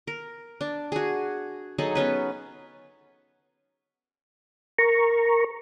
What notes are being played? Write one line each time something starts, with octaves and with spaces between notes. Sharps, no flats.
A#4
D4
F#4 G#4
F#3 D#4 G#4 A4
B3 C#4 B4
A#4 A#5 C#6